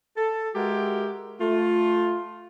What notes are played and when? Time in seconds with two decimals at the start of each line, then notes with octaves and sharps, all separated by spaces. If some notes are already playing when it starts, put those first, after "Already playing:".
0.17 A4
0.55 G#3 F#4 G4 A#4 E5
1.41 A3 F4